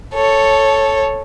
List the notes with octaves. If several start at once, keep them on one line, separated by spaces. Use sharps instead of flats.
A4 C#5